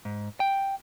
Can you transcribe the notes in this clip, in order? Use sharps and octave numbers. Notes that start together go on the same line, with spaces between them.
G#2
G5